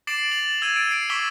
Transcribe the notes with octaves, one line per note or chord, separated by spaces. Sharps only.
D6 A6 C7 D7 E7 F#7
A6 F7 F#7
E6 G#6 A6 D#7
D7
C7 D7
C#6 D6 E6 B6 E7 G7